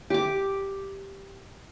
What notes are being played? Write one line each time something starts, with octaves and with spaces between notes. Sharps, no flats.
G4 D6